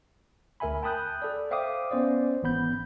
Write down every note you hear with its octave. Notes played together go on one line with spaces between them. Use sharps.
D2 A#4 E5 G#5 B5
G5 A5 B5 D#6 F#6 G6
A4 D5
C5 E5 F5 G5 D6 D#6
B3 C#4 C5 D5
G#1 E3 B3 B5 G6